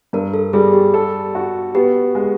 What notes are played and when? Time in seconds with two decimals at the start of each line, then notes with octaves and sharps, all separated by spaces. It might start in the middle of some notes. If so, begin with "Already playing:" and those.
0.13 G2 A#4
0.34 A4
0.53 G3 G#4
0.73 G4
0.94 A4
1.35 F#4
1.75 B3 G4
2.15 G#3